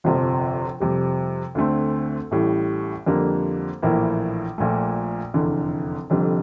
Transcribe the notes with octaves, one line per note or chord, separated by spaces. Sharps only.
G1 F2 C3 F3
F2 C3 G3
D2 D3 A3 C4
A1 A2 G3
F2 D3 G3 A#3
A#1 A2 E3 A#3 E4
A#1 A#2 A3
F1 E2 D3
F1 F2 D3 G3